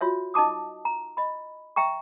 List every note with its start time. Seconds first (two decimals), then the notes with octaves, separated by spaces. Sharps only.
0.01 F4 F#4 C#5 E5
0.34 D#4 D#5 A5 D6 D#6
0.85 A#5
1.17 D#5 B5
1.76 E5 G5 A#5 C#6